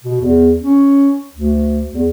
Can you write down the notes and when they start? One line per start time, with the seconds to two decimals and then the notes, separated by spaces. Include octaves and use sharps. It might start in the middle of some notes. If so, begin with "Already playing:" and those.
0.04 B2
0.21 E2
0.61 C#4
1.33 D2
1.93 E2